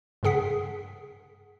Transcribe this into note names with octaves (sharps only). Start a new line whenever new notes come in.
G2 C#3 G#4 F#5 B6